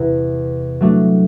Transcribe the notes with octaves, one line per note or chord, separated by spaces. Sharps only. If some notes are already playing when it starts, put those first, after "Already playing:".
Already playing: E2 C3 E3 B3
F#3 A3 D4 F#4